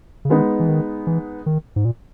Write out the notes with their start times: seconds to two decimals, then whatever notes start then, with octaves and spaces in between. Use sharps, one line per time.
0.25 C#3
0.30 D#3 G#3 B3 D#4
0.60 E3
0.69 D#3
1.07 E3
1.46 D#3
1.76 G#2
1.85 A#2